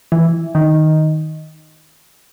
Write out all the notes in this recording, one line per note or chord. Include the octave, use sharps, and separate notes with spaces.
E3
D#3